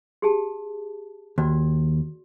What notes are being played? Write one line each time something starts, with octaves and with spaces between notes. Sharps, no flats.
G4 G#4 A5
D#2 F#4 D5